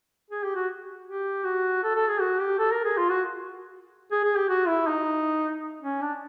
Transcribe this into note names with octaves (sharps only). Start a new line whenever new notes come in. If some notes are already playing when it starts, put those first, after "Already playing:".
G#4
G4
F#4
G4
F#4
A4
A4
G#4
F#4
G4
A4
A#4
G#4
F4
F#4
G#4
G#4
G4
F#4
E4
D#4
C#4
D4